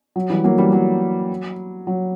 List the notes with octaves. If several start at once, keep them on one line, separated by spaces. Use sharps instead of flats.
F#3
E3 G3
F#3 A#3
E3 G3
F#3
F#3